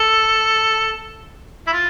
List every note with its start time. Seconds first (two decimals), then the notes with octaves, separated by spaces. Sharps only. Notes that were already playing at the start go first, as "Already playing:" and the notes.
Already playing: A4
1.67 E4
1.72 F4